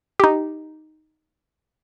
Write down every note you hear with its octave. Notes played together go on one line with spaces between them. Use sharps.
D#4 G4